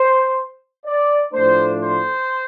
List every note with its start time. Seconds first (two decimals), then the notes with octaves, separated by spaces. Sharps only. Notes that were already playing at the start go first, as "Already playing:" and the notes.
Already playing: C5
0.86 D5
1.34 A2 F3 A3 D4 C5
1.83 C5